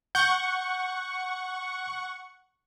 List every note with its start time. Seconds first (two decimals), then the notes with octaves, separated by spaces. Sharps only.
0.15 F#5 C#6 G6